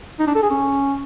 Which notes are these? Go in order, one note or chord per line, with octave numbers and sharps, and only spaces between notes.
D#4
D4
A4
G#4
C#4